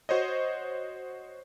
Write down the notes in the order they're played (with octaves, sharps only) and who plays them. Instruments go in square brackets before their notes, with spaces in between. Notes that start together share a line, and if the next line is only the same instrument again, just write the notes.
[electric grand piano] F#4 C5 C#5 D#5